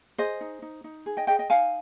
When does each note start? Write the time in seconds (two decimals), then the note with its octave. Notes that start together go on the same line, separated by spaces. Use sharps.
0.18 G#4 C5 D#5
0.41 D#4
0.62 D#4
0.84 D#4
1.06 G#4
1.17 D#5 G5
1.27 G#4 D#5 G5
1.39 D#5 G5
1.50 D#4 F5 G#5